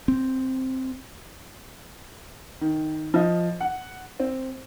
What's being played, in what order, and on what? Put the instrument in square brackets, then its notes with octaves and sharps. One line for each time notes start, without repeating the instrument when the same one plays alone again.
[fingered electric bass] C4
[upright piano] D#3
F3 D#5
F#5
C4